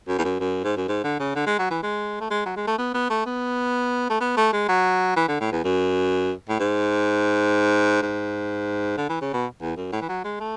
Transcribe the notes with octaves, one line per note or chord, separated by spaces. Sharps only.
F#2
E2
F#2
F#2
G#2
F#2
G#2
D3
C#3
D3
G#3
F#3
E3
G#3
A3
G#3
F#3
G#3
A3
B3
B3
A3
B3
A3
B3
A3
G#3
F#3
E3
D3
A2
E2
F#2
A2
G#2
G#2
D3
E3
C#3
B2
E2
F#2
A2
E3
F#3
G#3
A3